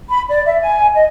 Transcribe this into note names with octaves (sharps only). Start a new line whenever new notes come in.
B5
D5
E5
G#5
D#5